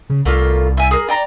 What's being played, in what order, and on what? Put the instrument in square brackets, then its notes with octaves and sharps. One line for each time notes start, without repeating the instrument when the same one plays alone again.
[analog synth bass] C#3
[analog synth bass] C2 [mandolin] A3 A#3 F4
[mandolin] E5 G#5
G#4 A#4
D5 G5 A#5